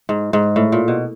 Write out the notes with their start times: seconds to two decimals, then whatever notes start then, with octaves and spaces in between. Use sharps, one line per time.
0.09 G#2
0.33 G#2
0.56 A2
0.72 A#2
0.88 B2